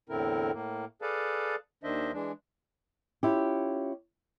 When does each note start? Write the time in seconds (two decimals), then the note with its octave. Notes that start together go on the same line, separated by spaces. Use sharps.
0.09 E2 A2 D3 C4 E4 A#4
0.53 A2 A#3
1.02 G#4 A4 B4 D5 F5 A5
1.84 D#2 D#3 D4 C5 D#5 E5
2.13 E3 G#3 D4
3.23 C#4 E4 F4 G4